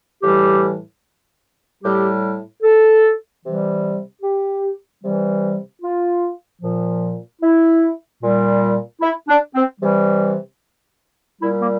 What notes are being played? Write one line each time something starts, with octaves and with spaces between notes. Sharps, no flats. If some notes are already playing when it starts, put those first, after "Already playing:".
A2 E3 G3 G4
A2 G3 G4
A4
C3 E3 G3
G4
C3 E3 G3
F4
A#2 F3
E4
A#2 G3
E4
D4
C4
C3 E3 G3
A#2 G3 E4
A#3